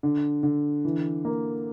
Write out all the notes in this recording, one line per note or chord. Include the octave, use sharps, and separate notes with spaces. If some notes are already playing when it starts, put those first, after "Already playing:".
D3
D3
E3
A#3